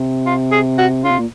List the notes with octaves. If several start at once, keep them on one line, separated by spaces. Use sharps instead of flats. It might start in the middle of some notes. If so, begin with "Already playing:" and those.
Already playing: C3
F4
G#4
F#4
C#3 F4
C3
A#2